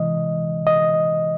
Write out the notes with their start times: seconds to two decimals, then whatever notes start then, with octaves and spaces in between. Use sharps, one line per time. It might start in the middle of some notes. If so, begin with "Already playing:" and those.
Already playing: C3 E3 G#3 D#5
0.67 D#5